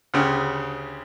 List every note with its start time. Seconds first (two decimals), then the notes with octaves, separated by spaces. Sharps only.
0.14 D2 C#3 G4